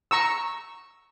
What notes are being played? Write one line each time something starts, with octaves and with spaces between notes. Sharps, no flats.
A#5 C#6 E6